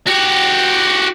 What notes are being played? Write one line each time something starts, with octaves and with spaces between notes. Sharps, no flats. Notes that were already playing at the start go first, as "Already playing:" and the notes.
F#4 G4